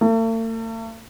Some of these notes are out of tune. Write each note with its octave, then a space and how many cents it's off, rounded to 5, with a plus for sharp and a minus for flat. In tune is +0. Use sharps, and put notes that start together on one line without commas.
A3 +45